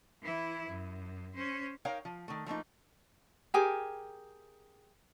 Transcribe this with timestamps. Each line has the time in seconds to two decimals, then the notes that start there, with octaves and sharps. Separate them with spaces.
0.22 E3 E4
0.68 F#2
1.34 C#4 C5
1.85 D#4 A#4 C#5 F5 G5
2.05 F3
2.28 D#3 A3
2.46 F3 A3 A#3 D#4
3.54 G4 G#4 A#4 G#5